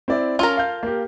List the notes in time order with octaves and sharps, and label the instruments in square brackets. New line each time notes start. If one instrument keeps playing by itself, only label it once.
[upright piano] C4 E4 D5
[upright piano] C#4 [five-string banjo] F4 A4 A#4
[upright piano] F5 G6
A#3 G4